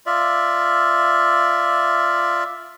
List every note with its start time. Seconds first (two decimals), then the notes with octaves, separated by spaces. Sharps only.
0.06 F4 D5 E5